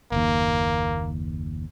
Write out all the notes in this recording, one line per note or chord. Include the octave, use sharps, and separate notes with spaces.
F#1 D#2 A#3